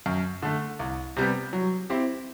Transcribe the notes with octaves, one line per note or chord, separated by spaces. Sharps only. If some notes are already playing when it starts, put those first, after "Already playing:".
F#2
D3 A3
C2
C3 G3 B3
F#3
C4 E4 G4